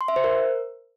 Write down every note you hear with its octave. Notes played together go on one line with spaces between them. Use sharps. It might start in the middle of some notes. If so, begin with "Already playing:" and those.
C6
E5
C5
A#4